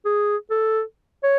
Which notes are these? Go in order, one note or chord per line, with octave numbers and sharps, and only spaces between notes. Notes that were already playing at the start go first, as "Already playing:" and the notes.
G#4
A4
C#5